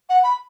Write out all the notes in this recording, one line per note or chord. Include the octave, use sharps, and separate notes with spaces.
F#5
B5